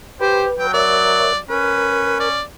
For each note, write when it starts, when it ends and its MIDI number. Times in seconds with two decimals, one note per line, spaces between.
0.21 0.47 67
0.21 0.67 71
0.21 0.44 72
0.59 1.38 54
0.59 0.69 79
0.74 1.33 70
0.74 1.33 73
0.74 1.38 74
0.74 1.33 76
1.50 2.38 61
1.50 2.29 70
1.50 2.20 71
2.20 2.42 74